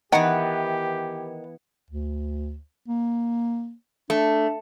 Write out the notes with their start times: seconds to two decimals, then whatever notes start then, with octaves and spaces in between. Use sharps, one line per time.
0.12 D#3 E3 B3 G4 F#5
1.91 D2
2.88 A#3
4.10 A3 D4